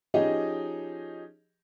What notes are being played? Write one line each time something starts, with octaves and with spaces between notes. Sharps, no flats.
F3 C#4 D#4 G4 G#4 D#5